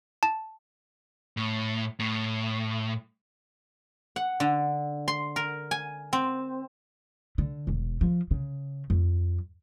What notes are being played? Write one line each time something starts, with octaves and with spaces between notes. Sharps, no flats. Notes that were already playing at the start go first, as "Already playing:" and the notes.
A5
A2
A2
F#5
D3
C6
A#4
G#5
C4
D3
E1
F3
C#3
F2